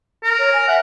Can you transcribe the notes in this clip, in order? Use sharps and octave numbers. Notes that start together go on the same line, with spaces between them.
A#4
C#5
G#5
E5 F#5